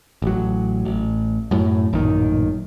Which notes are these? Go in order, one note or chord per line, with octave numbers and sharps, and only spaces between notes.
A1 F#3
A1
F#2 A2
A1 F#2 A#2 D#3